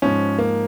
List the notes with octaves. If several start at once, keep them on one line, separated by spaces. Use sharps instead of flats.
G#2 F3 C#4
A#3